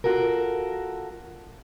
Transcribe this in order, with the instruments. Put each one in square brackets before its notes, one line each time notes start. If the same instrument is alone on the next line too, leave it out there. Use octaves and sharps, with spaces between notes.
[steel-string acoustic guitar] F4 F#4 A4 A#4